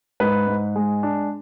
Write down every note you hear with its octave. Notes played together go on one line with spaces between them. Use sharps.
G#2 B4
G#2
G#3
D4